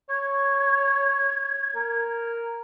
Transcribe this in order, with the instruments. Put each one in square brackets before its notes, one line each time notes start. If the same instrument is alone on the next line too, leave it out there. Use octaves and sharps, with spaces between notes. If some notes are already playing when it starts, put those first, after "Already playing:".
[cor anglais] C#5 [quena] G#6
[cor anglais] A#4